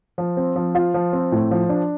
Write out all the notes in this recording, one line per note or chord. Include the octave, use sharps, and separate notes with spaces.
F3
C4
F3
F4
F3
C4
A2
F3
D4